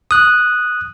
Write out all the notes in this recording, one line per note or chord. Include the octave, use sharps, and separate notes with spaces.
D#6 F#6